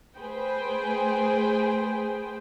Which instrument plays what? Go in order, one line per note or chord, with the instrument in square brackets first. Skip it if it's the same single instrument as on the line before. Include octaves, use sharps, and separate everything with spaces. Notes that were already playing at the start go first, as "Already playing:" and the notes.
[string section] A3 G#4 B4 C5 G5